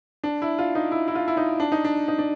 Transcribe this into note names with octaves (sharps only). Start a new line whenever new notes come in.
D4
E4
F4
D#4
E4
E4
F4
E4
D#4
D4
D#4
D4
D#4
D4